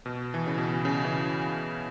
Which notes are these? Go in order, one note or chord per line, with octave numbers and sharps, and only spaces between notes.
B2
E3
C#3
B2
C#3
E3